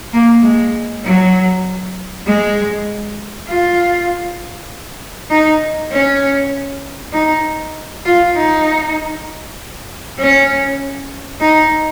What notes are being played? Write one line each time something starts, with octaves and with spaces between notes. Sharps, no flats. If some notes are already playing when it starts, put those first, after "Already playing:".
A#3
G#3
F#3
G#3
F4
D#4
C#4
D#4
F4
D#4
C#4
D#4